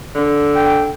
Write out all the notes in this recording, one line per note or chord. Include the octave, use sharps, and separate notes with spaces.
D3
G5